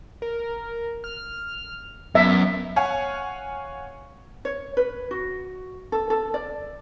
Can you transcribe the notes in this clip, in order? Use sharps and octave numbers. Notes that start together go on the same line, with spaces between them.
A#4
F6
F#2 B3 E5
C#5 F5 F#5 G#5
C#5
B4
F#4
A4
A4
D5